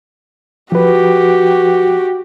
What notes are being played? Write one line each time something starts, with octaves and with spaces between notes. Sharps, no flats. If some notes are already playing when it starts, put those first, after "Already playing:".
F3 F#4 G4 B4